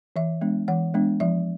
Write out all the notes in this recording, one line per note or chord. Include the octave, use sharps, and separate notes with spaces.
E3 E5
G#3 B3 D4
E3 F#5
G#3 B3 D4
F3 E5